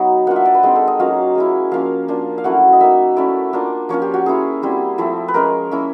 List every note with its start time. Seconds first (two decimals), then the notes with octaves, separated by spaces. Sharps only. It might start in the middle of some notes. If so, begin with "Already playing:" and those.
Already playing: F#3 B3 D#4
0.27 A#3 D4 F4 F#5
0.36 E5
0.46 D5
0.54 B4
0.63 G#3 C4 D#4
0.76 A4
0.88 D#5
0.99 F#3 A#3 C#4 F4 F5
1.35 G#3 C#4 E4
1.71 F3 A#3 C#4 F5
2.08 A#3 D4 F4
2.38 F5
2.44 F#3 A3 C#4 E4 F#5
2.73 D#5
2.81 A#3 D#4 E5
3.17 A3 C#4 E4 D5
3.53 A#3 D4 F4
3.89 F3 A#3 C#4 F4 C#5
4.02 G4
4.14 F#4
4.26 A#3 C#4 E4 G#4
4.62 G3 C4 E4
4.98 F3 A3 C4 E4
5.28 B4
5.34 G#3 C#4 F4 A#4
5.71 A#3 C#4 E4